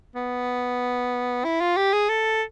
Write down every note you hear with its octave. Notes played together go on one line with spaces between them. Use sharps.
B3
E4
F4
G4
G#4
A4